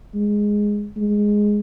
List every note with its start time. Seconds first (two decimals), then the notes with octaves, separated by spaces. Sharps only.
0.15 G#3
0.97 G#3